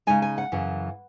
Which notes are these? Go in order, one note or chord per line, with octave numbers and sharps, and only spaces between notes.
C#3 G#3 D#4 G#5
G#5
F#5
F#2 C#3 E3